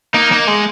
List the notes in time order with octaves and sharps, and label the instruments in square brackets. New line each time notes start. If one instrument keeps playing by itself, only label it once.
[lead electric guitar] A#3 [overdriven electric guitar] D#4
[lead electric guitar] A#3
G#3